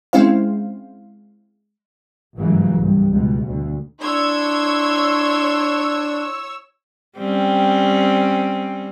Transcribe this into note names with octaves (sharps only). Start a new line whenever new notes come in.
G#3 C4 C#4 E4 C5 F5
G1 G#2 C#3 E3 F#3 A#3
C2 G2
C#2 B2
D2
D4 E4 C#5 C6 E6 G#6
G3 C4 C#4